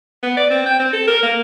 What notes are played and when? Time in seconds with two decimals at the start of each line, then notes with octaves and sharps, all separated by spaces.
0.23 B3
0.37 D5
0.50 C4
0.66 G5
0.79 C4
0.93 A4
1.07 A#4
1.23 A#3